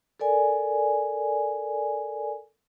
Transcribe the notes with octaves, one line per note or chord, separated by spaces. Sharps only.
A4 A#4 D5 G#5